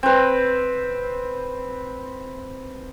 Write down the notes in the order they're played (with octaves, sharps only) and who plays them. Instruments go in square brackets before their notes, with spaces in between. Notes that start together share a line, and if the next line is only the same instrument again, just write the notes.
[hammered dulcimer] C4 B4